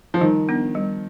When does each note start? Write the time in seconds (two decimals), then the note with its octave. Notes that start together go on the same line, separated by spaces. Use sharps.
0.14 F3
0.21 D#3 G3
0.49 B3 D4
0.75 G3